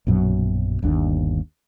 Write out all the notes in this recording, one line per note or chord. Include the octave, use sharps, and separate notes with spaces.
A#1 F#2 B2 F#3
G1 D#2 D4